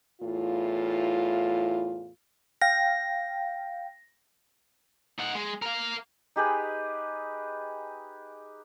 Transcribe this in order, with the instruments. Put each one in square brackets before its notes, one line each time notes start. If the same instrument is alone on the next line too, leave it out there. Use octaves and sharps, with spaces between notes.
[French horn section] E2 A2 F4
[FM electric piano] F5 G5 [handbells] A#6
[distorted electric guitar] D#4 F#5
G#3
A#4 F5
[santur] D#4 G4 G#4 B4